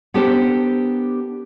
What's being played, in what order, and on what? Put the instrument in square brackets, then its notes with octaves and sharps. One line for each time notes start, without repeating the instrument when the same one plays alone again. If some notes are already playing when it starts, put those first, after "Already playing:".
[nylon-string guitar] B3 D4 G4 A4 A#4 C5